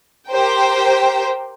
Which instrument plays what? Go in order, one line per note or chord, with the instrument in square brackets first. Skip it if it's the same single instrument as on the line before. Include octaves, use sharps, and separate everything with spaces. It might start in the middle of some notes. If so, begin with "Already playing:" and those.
[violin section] G4 A#4 C5 G5